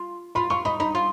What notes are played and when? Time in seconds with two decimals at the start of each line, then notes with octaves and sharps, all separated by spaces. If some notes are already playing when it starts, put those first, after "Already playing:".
Already playing: F4
0.35 F4 B5
0.50 F4 C#6
0.65 D#4 B5
0.80 D#4 B5
0.95 F4